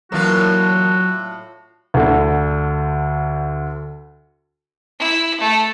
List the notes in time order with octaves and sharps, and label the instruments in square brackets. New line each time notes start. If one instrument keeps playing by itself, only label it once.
[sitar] A2 D4 F4 [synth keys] E3 A#3 A#4 [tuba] F#3 [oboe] F#4
[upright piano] D2 D3
[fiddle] E4
A3